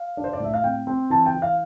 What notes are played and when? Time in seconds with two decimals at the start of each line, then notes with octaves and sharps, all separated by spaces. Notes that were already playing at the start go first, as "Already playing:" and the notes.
Already playing: F5
0.17 D4
0.24 C5
0.33 D5
0.40 A2 E5
0.54 F5
0.63 C4 G5
0.87 C4
1.10 E3 A5
1.26 G5
1.34 E3
1.42 F5